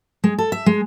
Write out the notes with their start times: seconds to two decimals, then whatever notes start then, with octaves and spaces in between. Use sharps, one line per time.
0.24 G#3
0.38 A4
0.52 E5
0.66 G#3